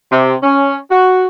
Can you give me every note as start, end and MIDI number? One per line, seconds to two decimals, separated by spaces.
0.12 0.35 48
0.43 0.79 61
0.91 1.27 66